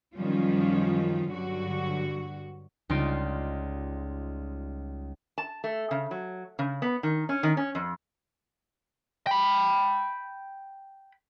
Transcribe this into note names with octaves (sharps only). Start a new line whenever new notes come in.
F#2 D#3 F3 G3 C#4 F4
G2 D3 F#3 F#4
C#2 G3 D#4 F4 C6 D7
A5
A3
C#3
F#3
C#3
B3
D#3
C#4
D#3
C#4
F2
G5 B5